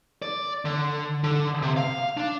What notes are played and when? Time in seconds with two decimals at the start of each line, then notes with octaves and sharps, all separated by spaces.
0.22 D5
0.65 D3
1.24 D3
1.62 C3
1.77 F5
2.17 D4